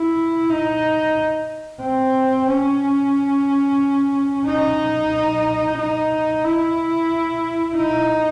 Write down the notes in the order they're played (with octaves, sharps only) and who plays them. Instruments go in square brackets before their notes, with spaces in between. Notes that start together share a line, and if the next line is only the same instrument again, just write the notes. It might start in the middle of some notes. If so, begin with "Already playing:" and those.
Already playing: [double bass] E4
D#4
C4
C#4
D#4
D#4
E4
D#4